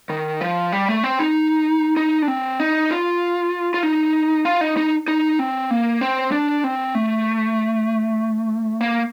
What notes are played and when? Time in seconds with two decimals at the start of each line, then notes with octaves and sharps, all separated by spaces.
0.10 D#3
0.41 F3
0.72 G3
0.89 A3
1.03 C4
1.19 D#4
1.97 D#4
2.22 D4
2.28 C4
2.60 D#4
2.91 F4
3.74 F4
3.83 D#4
4.45 F4
4.61 D#4
4.77 D#4
5.08 D#4
5.39 C4
5.71 A#3
6.01 C4
6.32 D4
6.64 C4
6.95 A3
8.81 A#3